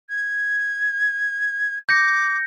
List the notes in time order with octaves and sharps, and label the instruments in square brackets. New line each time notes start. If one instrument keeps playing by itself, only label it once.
[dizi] G#6
[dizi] D6 [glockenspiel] G6 A#6 C#7